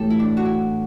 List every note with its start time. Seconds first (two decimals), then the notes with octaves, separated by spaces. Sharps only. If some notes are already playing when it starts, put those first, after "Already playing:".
Already playing: A2 E3 G4 A4
0.10 E4
0.19 D4
0.37 F#4
0.45 E4